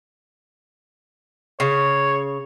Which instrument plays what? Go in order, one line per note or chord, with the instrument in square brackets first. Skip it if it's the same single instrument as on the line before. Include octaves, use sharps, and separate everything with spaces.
[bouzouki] C#3 [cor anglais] C#5